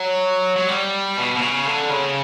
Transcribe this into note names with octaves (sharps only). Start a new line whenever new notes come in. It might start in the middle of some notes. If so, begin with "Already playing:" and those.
Already playing: F#3
F#3
G3
B2
B2
C#3
D3
C#3